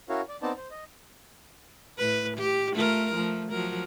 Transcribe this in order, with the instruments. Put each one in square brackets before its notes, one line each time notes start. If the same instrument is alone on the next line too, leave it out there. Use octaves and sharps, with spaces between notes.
[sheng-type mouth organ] C#4 E4 F#4 A#4 C#5 F5
D5
B3 C4 D#4 C5 D5 A5
C5
D#5
[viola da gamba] A2 B4
G4
A3 F4 A#4
F3 A3
F3 F#3 A#4